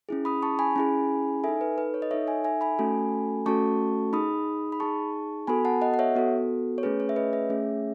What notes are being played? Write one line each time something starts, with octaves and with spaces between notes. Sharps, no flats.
C#4 E4 G#4
B5 D#6
A5 C#6
G#5 B5
C#4 E4 G#4
D#4 A4 E5 G#5
B4
B4
C#5
D#5
D#4 A4 C#5 E5
E5 G#5
E5 G#5
G#5 B5
A3 C#4 F#4 A4
A3 C#4 F#4 A4 A5 C#6
D#4 G#4 B5 D#6
B5
D#4 G#4 A5 C#6
B3 F#4 A4 G#5 B5
F#5 A5
D#5 F#5
F#5
C#5 E5
B3 F#4 A4
C#5
A3 C#4 G#4 B4
C#5
E5
B4 D#5
C#5 E5
A3 C#4 G#4